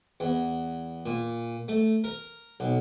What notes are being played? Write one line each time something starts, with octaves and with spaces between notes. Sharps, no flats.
E2
A#2
A3
A#4
B1